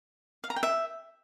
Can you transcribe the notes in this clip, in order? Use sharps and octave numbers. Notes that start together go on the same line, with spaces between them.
F5
A#5
G5
E5